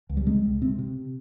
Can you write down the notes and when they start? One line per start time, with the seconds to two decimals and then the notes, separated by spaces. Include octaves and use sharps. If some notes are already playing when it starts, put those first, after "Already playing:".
0.09 C#2
0.17 G3
0.26 C3 G#3
0.44 C#2
0.62 C3 C4
0.79 C3